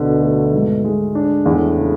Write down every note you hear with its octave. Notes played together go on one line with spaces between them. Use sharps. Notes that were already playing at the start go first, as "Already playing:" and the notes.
Already playing: D2 B2 D3
A3
G#2
G#3
D4
E2 A2
C#3